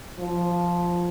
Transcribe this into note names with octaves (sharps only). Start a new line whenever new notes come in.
F3